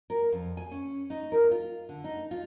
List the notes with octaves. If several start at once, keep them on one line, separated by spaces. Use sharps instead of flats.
A#4
F2
G#5
C#4
D#4
A#4
F4
D3
D#4
F4